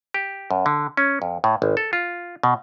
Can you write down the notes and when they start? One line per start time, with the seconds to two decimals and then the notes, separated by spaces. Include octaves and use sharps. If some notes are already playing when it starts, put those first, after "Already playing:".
0.14 G4
0.51 F#2
0.66 D3
0.97 C#4
1.22 F2
1.44 A2
1.62 G#1
1.77 A4
1.93 F4
2.43 B2